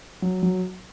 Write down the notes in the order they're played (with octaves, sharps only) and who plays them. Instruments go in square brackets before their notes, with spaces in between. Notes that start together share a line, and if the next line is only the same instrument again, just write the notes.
[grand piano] F#3
F#3